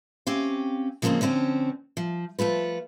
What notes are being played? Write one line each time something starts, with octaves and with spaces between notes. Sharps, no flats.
C4 C#4 G4 F5
C#3 F3 G#3 A#3 C4 C#4
D3 F3 C4 C#4
F3
F3 A3 F4 B4